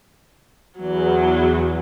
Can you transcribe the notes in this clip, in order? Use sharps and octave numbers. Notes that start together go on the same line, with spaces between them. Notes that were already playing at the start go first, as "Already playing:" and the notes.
E2 F#3